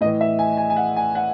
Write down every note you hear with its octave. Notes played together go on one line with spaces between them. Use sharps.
A2 E3 D#5
E5
G#5
G#5
G#5
F#5
G#5
F#5